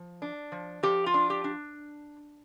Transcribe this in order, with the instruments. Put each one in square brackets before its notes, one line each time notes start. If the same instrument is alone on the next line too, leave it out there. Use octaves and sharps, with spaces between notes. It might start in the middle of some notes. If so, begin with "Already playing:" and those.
Already playing: [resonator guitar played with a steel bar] F3
D4
F3
F3 G4
F4
D4
G4
D4